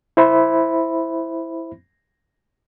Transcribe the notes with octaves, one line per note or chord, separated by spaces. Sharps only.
E4 C5 E5 B5